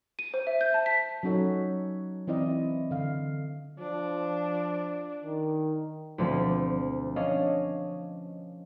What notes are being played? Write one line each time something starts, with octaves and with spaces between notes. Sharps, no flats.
D#7
C5
E5
G6
A5
B6
F#3 C#4 D#4 F#4 A4 C#5
E3 C4 E4 D5 D#5
D3 F5
F3 D4
D#3
D2 B2 D3 F3 A3 C4
C#4 D4 D#5 F5